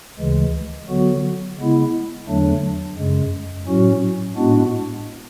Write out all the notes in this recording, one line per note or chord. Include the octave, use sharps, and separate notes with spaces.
D2 C#3 E3 G#3
D3 F#3 B3 F#4
C#3 G#3 B3 E4
E2 D3 F#3 A3 D4
F#2 C#3 G#3
A2 F#3 C#4 F#4
A2 G#3 B3 D4 F#4